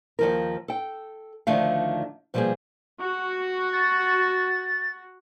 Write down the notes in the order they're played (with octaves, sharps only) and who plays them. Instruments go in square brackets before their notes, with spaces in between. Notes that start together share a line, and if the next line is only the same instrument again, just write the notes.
[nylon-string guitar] D#2 F3 A#4
A4 G5
D2 D3 D#3 F3 A3 F5
B2 F3 G3 A#3 G4 G#4
[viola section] F#4
[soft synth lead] A6